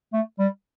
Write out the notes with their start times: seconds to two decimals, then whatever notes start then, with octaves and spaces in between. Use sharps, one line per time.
0.13 A3
0.39 G3